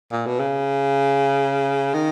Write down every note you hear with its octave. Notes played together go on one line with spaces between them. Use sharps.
A#2
B2
C#3
D#3